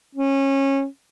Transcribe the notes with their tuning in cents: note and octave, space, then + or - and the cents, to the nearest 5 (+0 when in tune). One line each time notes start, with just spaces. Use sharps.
C#4 -20